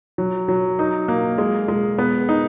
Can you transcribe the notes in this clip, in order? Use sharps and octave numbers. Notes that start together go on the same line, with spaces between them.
F#3
F#3
D#4
A#3
G#3
G#3
B3
D#4